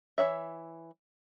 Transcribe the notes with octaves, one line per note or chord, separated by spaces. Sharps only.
E3 F3 C#5 E5